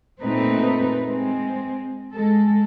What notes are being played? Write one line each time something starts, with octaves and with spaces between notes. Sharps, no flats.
A#2 A3 C4 D#4 B4
G#3 C4
G#3 A4